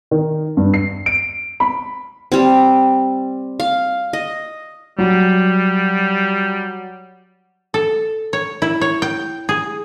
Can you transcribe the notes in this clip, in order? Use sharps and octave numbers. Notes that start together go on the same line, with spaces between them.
D#3
G2
C7
D7
B5
G3 C4
F5
D#5
F#3 G3
A4
C#5
E4
C#5
G5
G#4